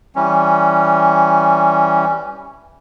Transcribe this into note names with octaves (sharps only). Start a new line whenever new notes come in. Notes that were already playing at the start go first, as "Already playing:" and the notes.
E3 G3 C#4